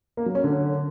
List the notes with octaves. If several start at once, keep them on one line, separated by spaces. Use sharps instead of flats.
A#3
F#3
C#4
D3